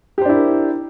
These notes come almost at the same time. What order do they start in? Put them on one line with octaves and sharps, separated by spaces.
G4 C5 D4 E4 A#4